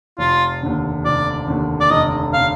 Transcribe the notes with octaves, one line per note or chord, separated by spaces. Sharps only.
F1 F4
D#2 D3
F1 D5
D#2 D3
D5
F1 D#5
D3 F5